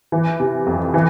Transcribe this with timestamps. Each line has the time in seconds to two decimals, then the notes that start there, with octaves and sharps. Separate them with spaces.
0.12 E3
0.40 C3
0.67 F2
0.94 E3